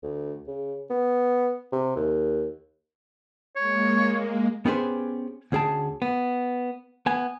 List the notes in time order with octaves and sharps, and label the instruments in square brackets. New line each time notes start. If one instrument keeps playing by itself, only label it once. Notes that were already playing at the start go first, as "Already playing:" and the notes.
[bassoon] D2
C#3
B3
C3
D#2
[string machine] G#3 A#3 [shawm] C#5
[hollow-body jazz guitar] B3 C#4 G4 G#4 B4 C5
D2 C#4 G#4 G5 A5
B3
B3 G#5